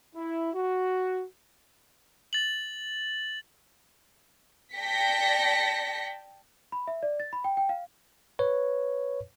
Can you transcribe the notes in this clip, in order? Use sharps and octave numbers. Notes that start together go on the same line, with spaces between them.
E4
F#4
A6 F#7
D5 G5 A5 A#6 B6 C#7
B5
E5
D5
A6
B5
G5
G5
F5
B4 C#5